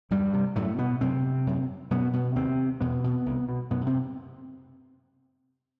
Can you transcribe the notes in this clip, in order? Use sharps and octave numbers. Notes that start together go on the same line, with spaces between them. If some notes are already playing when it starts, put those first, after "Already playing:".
E2 G2 G3
C3
F#2 A2 A3
B2 B3
F#2 C3 C4
F#2
F#2 B2 B3
B2 B3
D#2 C3 C4
E2 B2 B3
B2
C2
B2
F#2 B2 B3
C3 C4